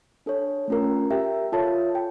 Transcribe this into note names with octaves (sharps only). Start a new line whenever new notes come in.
D4 A4 C#5
A3 C#4 F4 A#4
G4 A#4 E5 G5
F4 A4 C#5 E5 A5
G5